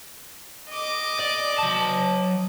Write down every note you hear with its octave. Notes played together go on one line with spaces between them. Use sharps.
D#5 D6
D5
F#3 A5